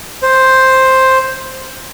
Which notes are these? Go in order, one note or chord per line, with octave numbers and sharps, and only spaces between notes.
C5